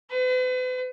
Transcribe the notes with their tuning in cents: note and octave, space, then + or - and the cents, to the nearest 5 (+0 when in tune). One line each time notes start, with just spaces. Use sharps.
B4 +45